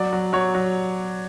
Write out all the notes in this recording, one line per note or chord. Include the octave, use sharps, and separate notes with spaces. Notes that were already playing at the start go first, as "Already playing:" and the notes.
Already playing: F#3 D5
F#3
F#3 C#5
F#3